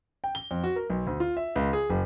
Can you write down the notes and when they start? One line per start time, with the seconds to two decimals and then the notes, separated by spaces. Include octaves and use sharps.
0.24 G5
0.35 G7
0.51 F2
0.64 F#4
0.76 A#4
0.90 B1
1.07 D2
1.20 F4
1.37 E5
1.56 C#2
1.73 G#4
1.90 F#1